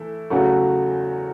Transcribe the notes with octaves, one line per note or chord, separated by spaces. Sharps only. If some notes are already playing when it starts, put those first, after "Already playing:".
Already playing: E3 A3 E4
E2 C#3 F#3 A3 F#4